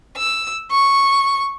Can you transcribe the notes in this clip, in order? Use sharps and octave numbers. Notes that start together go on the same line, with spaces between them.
E6
C#6